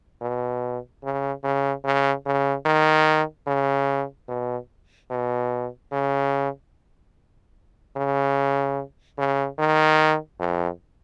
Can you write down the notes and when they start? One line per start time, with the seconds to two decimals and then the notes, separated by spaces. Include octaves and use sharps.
0.21 B2
1.04 C#3
1.44 C#3
1.84 C#3
2.26 C#3
2.66 D#3
3.47 C#3
4.28 B2
5.10 B2
5.92 C#3
7.96 C#3
9.18 C#3
9.59 D#3
10.40 F2